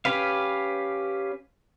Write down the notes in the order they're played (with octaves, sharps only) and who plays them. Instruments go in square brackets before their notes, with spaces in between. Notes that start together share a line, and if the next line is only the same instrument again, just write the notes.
[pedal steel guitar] C#4 G4 B4 F5